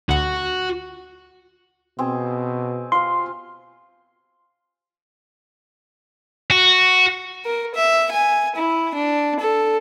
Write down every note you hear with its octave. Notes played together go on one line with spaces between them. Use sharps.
D2 F#4 F#5
B2 C4 G#4
F4 F5 C6
F#4
A#4
E5
G#5
E4
D4
A4